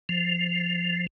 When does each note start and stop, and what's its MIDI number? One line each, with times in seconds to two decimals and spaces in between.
0.09 1.07 53